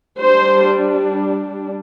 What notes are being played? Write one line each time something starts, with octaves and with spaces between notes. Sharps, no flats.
G3 D4 C5